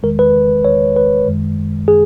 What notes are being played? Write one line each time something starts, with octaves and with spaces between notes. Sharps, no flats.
E2 D#3 G#3 A#4
B4
C#5
B4
F#2 D#3 G#3
G#4